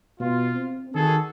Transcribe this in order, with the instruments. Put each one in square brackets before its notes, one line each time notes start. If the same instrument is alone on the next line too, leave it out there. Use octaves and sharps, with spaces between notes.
[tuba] B2 [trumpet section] F4
[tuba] C4
[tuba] D#3 [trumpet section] F#4 G#4 A4